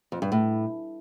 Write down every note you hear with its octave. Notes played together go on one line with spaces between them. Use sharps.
F2
G2
A2